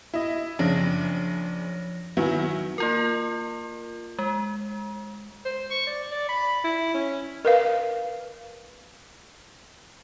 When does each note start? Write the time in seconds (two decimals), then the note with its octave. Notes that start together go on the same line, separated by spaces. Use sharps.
0.14 E4 D#5
0.59 F#1 C#3 F3 D4 C#5 A#6
2.17 D#3 F#3 E4 B4 E5 G#5
2.78 A#3 F4 A#4
4.19 G#3
5.45 C5
5.71 C#6
5.86 D5
6.11 D5
6.29 B5
6.64 E4
6.94 C#4
7.45 A#4 B4 F5